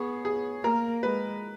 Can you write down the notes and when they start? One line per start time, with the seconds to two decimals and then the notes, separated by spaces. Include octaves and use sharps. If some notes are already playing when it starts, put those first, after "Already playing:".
Already playing: B3 G#4 C#5
0.25 G#4
0.63 A#3 A#4
1.03 G#3 B4